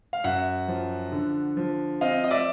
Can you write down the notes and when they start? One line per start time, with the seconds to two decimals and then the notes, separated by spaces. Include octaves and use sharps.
0.13 F5
0.24 F#2 E5 F#5
0.68 F3
1.12 D3
1.57 F3
2.01 C4 D#5 F5
2.24 D#5
2.31 D5 E5